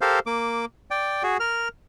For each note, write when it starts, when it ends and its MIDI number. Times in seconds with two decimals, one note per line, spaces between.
0.01 0.19 67
0.01 0.19 69
0.01 0.19 70
0.01 0.19 72
0.01 0.19 77
0.26 0.65 58
0.26 0.65 86
0.91 1.23 74
0.91 1.23 79
1.23 1.37 66
1.23 1.37 68
1.40 1.68 70
1.40 1.68 89